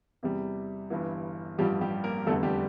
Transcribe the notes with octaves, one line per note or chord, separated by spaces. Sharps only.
E2 C3 G3
G1 G2 E3
A1 G2 F3 G3 G4
G3 G4
A#3 A#4
F1 E2 D3 G3 A3 A4
G3 G4